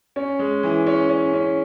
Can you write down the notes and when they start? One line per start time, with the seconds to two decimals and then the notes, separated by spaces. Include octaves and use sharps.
0.16 C#4
0.39 G#3
0.63 E3
0.87 C#4
1.10 C#4
1.33 C#4